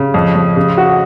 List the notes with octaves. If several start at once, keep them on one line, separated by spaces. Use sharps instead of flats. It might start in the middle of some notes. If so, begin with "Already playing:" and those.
Already playing: C#3
F2
F2
C#3
F#4